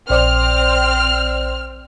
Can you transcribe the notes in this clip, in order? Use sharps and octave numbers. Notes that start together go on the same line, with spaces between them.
A#1 C4 C5 D5 F6